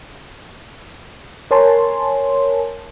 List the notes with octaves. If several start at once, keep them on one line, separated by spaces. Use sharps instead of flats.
A#4 C#5 G#5 A5 C6